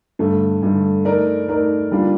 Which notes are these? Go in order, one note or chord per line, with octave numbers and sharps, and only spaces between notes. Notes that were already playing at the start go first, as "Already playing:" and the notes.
G2 D3 A3
G2 D3 A3
A3 D#4 A#4 D5
A3 D#4 A#4 D5
G3 A#3 D4 F4